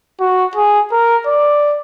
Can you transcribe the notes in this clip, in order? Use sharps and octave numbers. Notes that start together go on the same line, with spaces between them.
F#4
G#4
A#4
D5